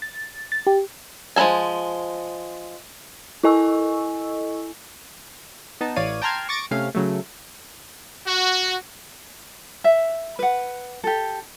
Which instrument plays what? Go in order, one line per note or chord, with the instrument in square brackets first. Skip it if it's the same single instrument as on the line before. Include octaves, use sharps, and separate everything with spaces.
[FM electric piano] A6
A6
G4
[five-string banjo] F3 G#3 D#4 A4 G#5
[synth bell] E4 A4 D#5 G#5 C#6 E6
[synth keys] B3 D#4 A5
A1 E3 C#5 D5 F5 D#7
G5 A5 A#5 C6 F6 G#6
C#6 D6 A6 A#6 C#7 D7
C3 A3 C#4 F5
C#3 F#3 A3
[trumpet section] F#4
[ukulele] E5
B4 F#5
G4 A4